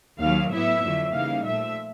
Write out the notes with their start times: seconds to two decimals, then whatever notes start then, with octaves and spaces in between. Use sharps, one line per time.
0.19 D#2 D#3 F#3 F5
0.51 A2 F#3 B3 E4 E5
0.82 F2 D3 F#3
1.13 C#3 E3 G3 A#3 D#4 F5
1.45 A#2 F3 A3 E5